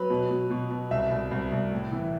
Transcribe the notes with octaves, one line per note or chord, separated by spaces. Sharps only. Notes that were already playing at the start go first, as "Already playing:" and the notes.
Already playing: F#3 B4
B2
B2
B2
B2
C2 E5
C2
C2
C2
A2
E3